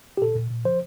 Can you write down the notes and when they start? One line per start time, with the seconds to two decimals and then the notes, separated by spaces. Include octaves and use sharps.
0.17 G4
0.22 A#2 A4
0.35 A#2
0.50 A#2
0.65 F3 C5